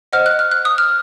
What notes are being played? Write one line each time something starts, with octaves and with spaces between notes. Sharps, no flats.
C5 D#5 F#5 F6
F#6
F6
F#6
D#6
F6